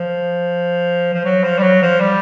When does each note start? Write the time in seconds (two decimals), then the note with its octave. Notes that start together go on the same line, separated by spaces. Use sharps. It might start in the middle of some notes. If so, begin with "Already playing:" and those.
Already playing: F3
1.13 F3
1.25 F#3
1.44 F3
1.59 G3
1.63 F#3
1.82 F3
2.00 G3